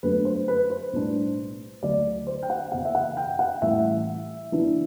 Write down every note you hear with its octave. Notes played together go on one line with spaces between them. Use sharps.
G1 F#2 F#3 A3 D4 B4
C5
B4
C5
B1 A2 G3 D4
D2 D3 F#3 D5
C5
G5
F#5
F#1 E2 B2 F#5
E5
F#5
G5
F#5
A1 A2 E3 G3 E5
F#1 F#2 E3 B3 D4